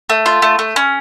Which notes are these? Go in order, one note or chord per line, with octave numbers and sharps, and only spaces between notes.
A3
F4
A3
A3
C#4